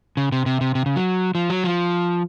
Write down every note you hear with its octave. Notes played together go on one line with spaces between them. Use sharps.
C#3
C3
C3
C3
C3
C#3
F#3
F3
F#3
F3